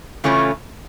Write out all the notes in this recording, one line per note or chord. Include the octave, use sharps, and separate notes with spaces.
C#3 E3 A3 C#4 F4